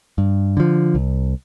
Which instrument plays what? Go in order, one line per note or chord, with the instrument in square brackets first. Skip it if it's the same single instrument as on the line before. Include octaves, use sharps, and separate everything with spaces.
[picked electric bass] G2
D3 F3
C2